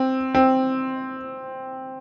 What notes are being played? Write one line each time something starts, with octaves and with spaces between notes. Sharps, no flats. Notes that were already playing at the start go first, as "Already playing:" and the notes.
Already playing: C4
C4